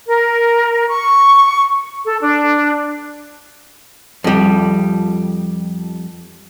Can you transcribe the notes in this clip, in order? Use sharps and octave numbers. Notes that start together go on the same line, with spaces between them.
A#4
C#6
A4
D4
F2 G3